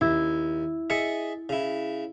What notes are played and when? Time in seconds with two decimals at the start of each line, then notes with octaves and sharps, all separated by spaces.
0.01 D#2 E4
0.90 G#4 D#5 E5 A6 C#7
1.49 C#3 E4